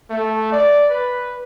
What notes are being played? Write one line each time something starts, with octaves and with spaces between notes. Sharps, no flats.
A3
D5
B4